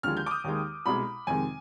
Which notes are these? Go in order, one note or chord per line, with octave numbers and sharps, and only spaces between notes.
D#2 D3 F3 G#3 F6
G6
D6
D#6
D#2 D#3 G#3
C2 B2 G#3 B5
F2 C3 D#3 G#3 G#5